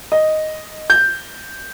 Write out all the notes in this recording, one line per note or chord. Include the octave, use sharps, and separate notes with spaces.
D#5
G6